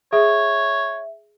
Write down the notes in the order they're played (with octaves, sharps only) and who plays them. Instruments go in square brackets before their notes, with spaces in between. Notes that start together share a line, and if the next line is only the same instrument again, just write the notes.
[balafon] G#4 [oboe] C#5 [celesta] E5